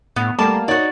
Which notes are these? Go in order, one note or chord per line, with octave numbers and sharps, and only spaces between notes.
A2 B3
G3 A3 A#3 A5 D6
D#4 F#4 C#5 D5